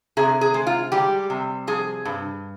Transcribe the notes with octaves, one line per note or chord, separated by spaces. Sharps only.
C3 G#4
G#4
G#3
F4
G3 G4
C3
F3 G#4
G2